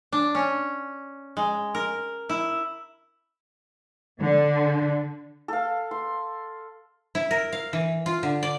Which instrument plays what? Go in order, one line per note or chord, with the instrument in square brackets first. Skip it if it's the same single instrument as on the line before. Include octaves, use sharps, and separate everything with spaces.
[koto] D4
C#4
G#3
A#4
E4
[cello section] D3
[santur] A4 F5
C6
[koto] E4
A#4
F5
E3
F4
D3
D5